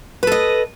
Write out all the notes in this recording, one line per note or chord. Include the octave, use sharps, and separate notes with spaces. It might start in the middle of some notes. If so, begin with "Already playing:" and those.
A4 B4 D#5